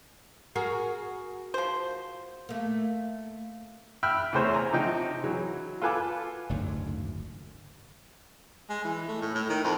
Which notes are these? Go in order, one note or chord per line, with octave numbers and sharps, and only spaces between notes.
F#4 G#4 A#4
F3 C5
A3 A#3
E5 G5 B5 F6 F#6
E2 C3 A3 G#4 C5 C#5
G#5 A#5
C3 F3 D#4 G5
E3 F#3
F4 A4 B4 G#5 D6
F#1 D2 G#2 D#3
G#3
E3
A3
A2
A2
D#3
F2